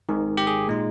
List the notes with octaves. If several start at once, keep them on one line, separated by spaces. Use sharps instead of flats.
G#1 G#2 D#3
G4
G#4
A#2 G#3 D#4